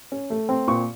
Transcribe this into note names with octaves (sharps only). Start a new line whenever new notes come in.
C#4
A3
C4
A#2 C#6